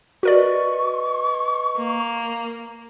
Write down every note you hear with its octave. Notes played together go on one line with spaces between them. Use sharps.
F#4 A#4 B4 D5 D#5 C#6
A#3